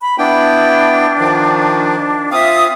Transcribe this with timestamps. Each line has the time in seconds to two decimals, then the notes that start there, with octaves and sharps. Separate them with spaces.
0.02 B5
0.18 B3 D4 E4 G5
1.19 D#3 F3
2.31 C4 F4 E5 F5 D#6